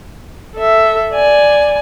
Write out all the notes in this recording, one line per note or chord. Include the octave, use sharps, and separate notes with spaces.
A4 E5
D5 G#5